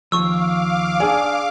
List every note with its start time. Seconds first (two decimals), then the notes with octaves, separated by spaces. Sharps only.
0.12 D#2 F3 F5 C#6 D6 E6
1.00 D4 G#4 D5 G#5